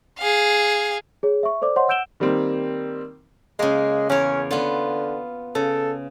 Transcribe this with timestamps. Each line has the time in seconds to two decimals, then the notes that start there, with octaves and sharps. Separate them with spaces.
0.19 G#4 F5
1.23 G#4 C#5
1.43 E5 C#6
1.62 A4 C5 D5 D6
1.76 C5 C#5 D#5 F#5 C6
1.88 F#5 E6 G6 D7 E7 G7
2.20 D#3 G3 A#3 C4
3.59 C#3 G#3 A#3
4.10 E2 C#4 A#4 C#5
4.51 D3 B3 F4
5.55 C#3 A4